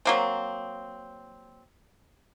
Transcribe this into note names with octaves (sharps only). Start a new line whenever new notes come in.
F#3 A#3 C4